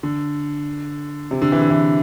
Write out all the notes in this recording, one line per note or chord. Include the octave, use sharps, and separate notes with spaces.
D3
C3
D3
E3
D3
E3